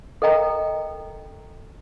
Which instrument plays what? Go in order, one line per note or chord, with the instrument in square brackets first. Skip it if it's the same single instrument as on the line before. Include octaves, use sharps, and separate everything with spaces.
[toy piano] A4 A#4 D#5 G5 A#5